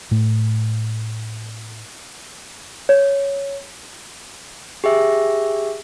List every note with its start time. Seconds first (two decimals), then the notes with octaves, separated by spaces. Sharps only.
0.11 A2 A3
2.89 C#5
4.84 G4 G#4 E5